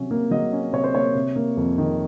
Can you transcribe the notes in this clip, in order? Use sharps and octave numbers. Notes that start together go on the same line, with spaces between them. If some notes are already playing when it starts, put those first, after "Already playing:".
Already playing: C3 F#3 C#4
A#3
F#3 D#5
C#4
C3 C#5
C5
A#3 C#5
C3
A#3
F2
D#3